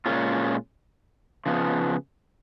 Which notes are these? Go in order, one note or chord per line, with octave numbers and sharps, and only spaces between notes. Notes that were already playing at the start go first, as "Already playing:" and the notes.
A#2 G#3 C#4 F4
C#3 F3 B3